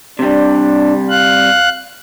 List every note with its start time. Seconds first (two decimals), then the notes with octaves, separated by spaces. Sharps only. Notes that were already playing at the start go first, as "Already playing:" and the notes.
0.19 C3 G3 D4
1.10 F5 F#6